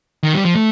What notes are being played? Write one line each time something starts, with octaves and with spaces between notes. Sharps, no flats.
D#3
G3
F3
A3